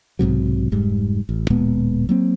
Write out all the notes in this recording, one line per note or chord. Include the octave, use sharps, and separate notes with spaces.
B1 G#2 C3 F#3
F1 G#2 G3
A1
D1 A#2 G#3 B3
F#3 A#3 C4